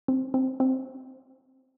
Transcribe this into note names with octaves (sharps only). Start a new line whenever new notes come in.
C4
C4
C4